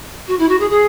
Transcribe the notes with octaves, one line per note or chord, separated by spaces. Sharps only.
F#4
E4
F#4
G#4
G#4